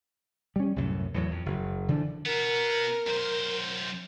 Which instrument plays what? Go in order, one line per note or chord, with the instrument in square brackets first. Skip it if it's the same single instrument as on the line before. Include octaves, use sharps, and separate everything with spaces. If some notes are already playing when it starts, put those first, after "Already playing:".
[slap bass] G3 C#4
C2 F#2 A2
E2 A2 F#3
F2
F#1
D3 E3 F3 D4
[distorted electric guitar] B2 B3 [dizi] A#4
[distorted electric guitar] F#2 C5